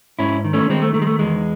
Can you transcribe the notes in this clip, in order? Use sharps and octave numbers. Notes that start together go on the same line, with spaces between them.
G#2 C#4 E4
D#3
A3 C#4
D#3 G#3 C4
A3
D#3 A3
G#3
A3
E2 G#3